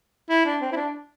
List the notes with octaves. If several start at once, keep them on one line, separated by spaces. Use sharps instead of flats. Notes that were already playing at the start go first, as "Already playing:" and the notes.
E4
D4
C4
E4
D4